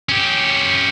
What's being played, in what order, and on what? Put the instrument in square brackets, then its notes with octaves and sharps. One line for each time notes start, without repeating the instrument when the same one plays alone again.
[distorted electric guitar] C#4 G4